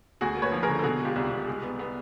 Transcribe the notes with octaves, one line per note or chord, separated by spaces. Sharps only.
D2 F#4 G#4
A#3
B4 C#5
F3
G#4 A#4
D3
A4
B2 F#4 G#4
G#3
F4 G4
C2
C2
G#3
B3
B3